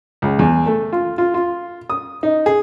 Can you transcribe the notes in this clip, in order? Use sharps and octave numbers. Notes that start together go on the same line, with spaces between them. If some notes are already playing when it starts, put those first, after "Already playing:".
C#2
E2
A3
F4
F4
F4
D#6
D#4
G#4